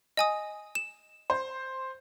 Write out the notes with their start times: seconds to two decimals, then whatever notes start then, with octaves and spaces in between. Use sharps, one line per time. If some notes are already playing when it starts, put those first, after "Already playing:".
0.17 D#5 G#5 D#6
0.75 E7
1.30 C5